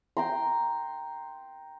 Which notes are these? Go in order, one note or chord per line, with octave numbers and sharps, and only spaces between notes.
G5 A#5 C6